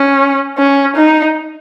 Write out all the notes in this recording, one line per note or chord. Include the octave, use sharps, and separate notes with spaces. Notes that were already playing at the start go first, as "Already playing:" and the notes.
Already playing: C#4
C#4
D#4